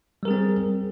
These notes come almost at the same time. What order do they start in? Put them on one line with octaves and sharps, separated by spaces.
G3 A#4 G#4 C4